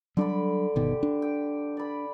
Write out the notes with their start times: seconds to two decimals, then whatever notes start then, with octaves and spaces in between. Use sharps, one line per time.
0.17 D3 F#3 G3 D4 D5 B5
0.76 G1 B2 D#3 G4
1.03 D4
1.22 G5
1.77 D5 B5